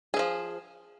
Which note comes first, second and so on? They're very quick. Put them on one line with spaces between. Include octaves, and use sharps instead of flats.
G#4 E3 F3